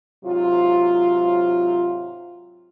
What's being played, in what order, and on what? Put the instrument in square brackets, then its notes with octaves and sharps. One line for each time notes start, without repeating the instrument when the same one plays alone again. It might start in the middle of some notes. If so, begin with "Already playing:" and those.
[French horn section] G#2 C3 F#3 F4